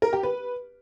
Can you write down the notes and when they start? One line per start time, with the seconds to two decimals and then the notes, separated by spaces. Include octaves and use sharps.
0.02 A#4
0.13 G4
0.23 B4